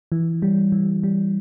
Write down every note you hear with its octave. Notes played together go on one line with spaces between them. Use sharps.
E3
G3
E3
G3